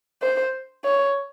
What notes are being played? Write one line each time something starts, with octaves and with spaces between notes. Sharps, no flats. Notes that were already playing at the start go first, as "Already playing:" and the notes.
C5
C#5